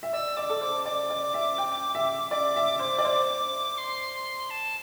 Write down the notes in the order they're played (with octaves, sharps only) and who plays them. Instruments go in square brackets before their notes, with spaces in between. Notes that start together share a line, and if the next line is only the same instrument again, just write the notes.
[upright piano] E5
[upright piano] D5 [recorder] E6
[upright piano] D5 [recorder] D6
[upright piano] A4
[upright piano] C5 [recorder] D6
[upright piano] D5 [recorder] D6
[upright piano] D5
E5
G5
E5
[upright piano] D5 [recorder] D6
[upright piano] E5
C5
D5
C5
[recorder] C6
A5